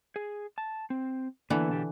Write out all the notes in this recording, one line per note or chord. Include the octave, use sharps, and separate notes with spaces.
G#4
A5
C4
D3 E3 A#3 B3 E4
B2 D4 G4